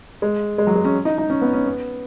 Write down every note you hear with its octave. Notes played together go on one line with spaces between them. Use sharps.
G#3
G#3
F#3
G#3
C#4
D#4
D#4
C#4
B3
C#4
B3